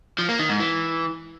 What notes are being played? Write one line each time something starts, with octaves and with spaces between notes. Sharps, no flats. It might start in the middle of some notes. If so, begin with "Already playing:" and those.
F3
A#3
D#3
G#2
E3